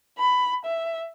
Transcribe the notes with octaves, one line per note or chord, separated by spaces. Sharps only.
B5
E5